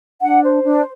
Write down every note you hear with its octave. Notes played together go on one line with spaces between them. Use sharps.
D4 F#5
C5
D4